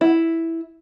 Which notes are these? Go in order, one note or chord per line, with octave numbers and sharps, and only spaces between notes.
E4